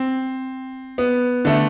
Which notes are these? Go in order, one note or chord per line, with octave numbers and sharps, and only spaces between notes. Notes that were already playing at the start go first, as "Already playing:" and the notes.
Already playing: C4
B3
D3 A3